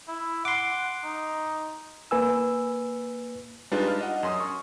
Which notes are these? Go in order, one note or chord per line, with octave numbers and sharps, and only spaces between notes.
E4
F#5 C6 D6
D#4
A#3 B4 G#5 E6
G3 G#3 D4 D#4 F4 B4
D4 F6
D#5 F#5
F#2 C6 D#6
C#6